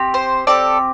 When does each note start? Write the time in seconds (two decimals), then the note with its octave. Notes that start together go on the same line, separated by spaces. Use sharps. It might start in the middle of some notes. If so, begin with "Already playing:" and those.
Already playing: C4 G4
0.14 C5
0.47 C4 G4 A4 D5